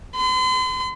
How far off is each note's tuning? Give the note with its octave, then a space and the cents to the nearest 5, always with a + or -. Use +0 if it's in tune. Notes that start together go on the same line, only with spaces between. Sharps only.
C6 -45